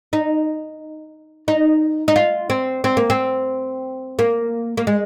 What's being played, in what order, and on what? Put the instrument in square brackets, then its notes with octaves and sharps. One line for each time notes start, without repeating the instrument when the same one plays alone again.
[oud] D#4
D#4
D#4
F4
C4
C4
A#3
C4
A#3
A#3
G#3